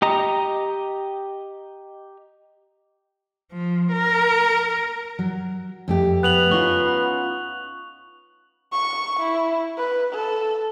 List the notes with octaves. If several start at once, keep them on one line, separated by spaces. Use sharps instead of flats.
G4 D#5 A#5
F3
A#4
F#3
F2 A3 G4
B3 F#6 F7 F#7
C#4 D#4 F4 C#6 F#6
C#6
E4
B4
A4